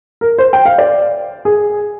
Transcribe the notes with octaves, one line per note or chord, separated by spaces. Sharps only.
A#4
C5
G5
F5
D5
G#4